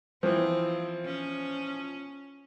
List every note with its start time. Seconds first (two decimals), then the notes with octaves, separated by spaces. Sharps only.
0.23 E3 F3 C4 F4
1.06 C#4